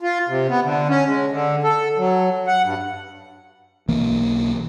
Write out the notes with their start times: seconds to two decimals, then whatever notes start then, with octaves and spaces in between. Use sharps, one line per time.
0.01 F4
0.28 C3
0.50 B3
0.63 D3
0.88 C#4
1.06 G#3
1.32 D3
1.64 A4
1.98 F#3
2.47 F#5
2.64 G2
3.88 B1 E3 A#3